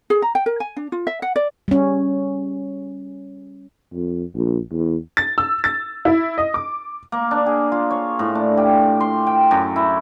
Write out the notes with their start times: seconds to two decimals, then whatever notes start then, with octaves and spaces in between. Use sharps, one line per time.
0.10 G#4
0.22 A#5
0.35 G5
0.46 A#4
0.60 G#5
0.76 D4
0.92 F4
1.07 E5
1.22 F#5
1.36 D5
1.68 G3 C#4
3.93 F2
4.36 A#1
4.71 E2
5.17 A6
5.38 E6
5.64 A6
6.05 E4
6.38 D#5
6.54 D6
7.12 A#3
7.31 D4
7.46 G#4
7.72 F4
7.91 C#5
8.19 A2
8.35 D4
8.57 G4
9.01 C6
9.27 G5
9.51 F#2
9.76 E4